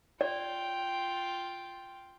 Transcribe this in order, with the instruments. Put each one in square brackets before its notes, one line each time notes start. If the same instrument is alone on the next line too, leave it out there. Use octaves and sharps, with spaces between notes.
[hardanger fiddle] F4 G5 [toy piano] D5